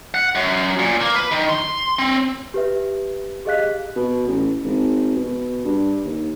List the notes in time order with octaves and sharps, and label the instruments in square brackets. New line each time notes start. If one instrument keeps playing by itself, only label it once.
[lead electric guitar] F#5
F#2
A#2
A#3
B4
D#3
C6
C4
[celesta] G4 B4 E5
G4 G#4 D#5 F5 F#6 B6
[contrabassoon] B2
A1
G#1
B2
G2
D#2